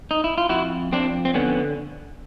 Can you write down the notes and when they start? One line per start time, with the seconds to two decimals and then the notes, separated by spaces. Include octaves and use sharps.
0.11 D#4
0.24 E4
0.38 F4
0.49 F2 E4 F#4
0.92 F2 C4 D4
1.25 C4
1.34 D3 B3 C#4